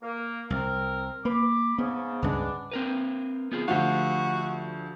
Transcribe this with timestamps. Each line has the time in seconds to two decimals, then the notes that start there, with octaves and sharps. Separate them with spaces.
0.02 A#3
0.50 C2 C4 A#4
1.25 A#3 B5 D6
1.78 G#2 C#3 B3
2.22 C#2 G2 G#3 B3 C#4 D4
2.71 C4 A#4 B4
3.52 B3 F4 G#4
3.68 D2 F3 F#4 G4 F5